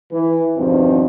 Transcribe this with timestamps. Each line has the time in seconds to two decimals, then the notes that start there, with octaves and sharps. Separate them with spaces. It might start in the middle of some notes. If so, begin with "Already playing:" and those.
0.12 E3
0.57 E2 G2 B2 D#3 F3 C4